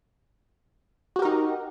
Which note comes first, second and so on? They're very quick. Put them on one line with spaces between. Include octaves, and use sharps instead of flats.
F#4 G4 A#4 D#4